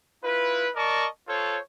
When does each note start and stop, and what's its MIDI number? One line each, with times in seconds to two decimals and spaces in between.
0.24 0.69 64
0.24 0.69 65
0.24 0.69 71
0.76 1.07 70
0.76 1.07 74
0.76 1.07 75
0.76 1.07 81
0.76 1.07 85
1.28 1.59 65
1.28 1.59 69
1.28 1.59 72
1.28 1.59 73